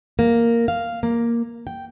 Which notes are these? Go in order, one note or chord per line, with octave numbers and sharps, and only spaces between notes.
A#3
F5
A#3
G5